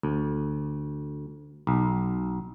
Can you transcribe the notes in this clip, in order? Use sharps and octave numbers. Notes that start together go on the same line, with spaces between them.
D2
B1